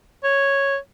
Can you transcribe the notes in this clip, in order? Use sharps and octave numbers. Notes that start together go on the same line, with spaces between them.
C#5